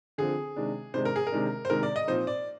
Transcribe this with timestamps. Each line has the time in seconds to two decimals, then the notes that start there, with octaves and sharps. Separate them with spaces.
0.18 D3 F3 C4 G#4
0.56 C3 D#3 G#3 D4
0.94 C3 D#3 G#3 D4 C5
1.05 A#4
1.16 G#4
1.27 A#4
1.32 C3 D#3 G#3 D4
1.65 C5
1.70 C3 D#3 G#3 D4 A#4
1.83 D5
1.96 D#5
2.08 A#2 F3 C4 D#4 C5
2.27 D5